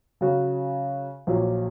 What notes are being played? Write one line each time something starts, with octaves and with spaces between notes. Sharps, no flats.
C#3 F#3 C#4 F#4
A#1 A#2 F#3